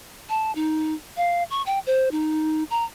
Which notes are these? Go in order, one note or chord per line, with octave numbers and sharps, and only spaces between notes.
A5
D#4
F5
C#6
G5
C5
D#4
A#5